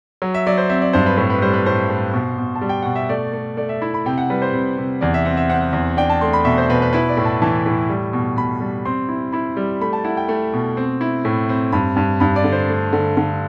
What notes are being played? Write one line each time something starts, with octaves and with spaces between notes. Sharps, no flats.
F#3
E5
F#3 D5
C5
C4 E5
D5
G2 C5
B4
A2 C5
B4
G3 C5
B4
A2 C5
A2
B2
B2
A5
G3
G5
B2 F#5
E5
A3 D5
A3
A3 D5
E5
E4 B5
B5
C3 G5
F#5
G3 B4
C5
C3
C3
E2 D5
E5
C4 F#5
E5
C4 F#5
E2
D4 G5
A5
A3 C6
B5
B2 E5
C5
B2 B4
B4
E4 B4
D5
A2
A5
E3 A5
A2
G3
B2
B2 B5
G3
C4 C6
E4
E4 B5
G3
A3 B5
A5
E4 F#5
G5
A3
B2
C4
E4
A2
C4
G2 B5
G2
G2 B5
D5
D3
C5
A3
D3
D3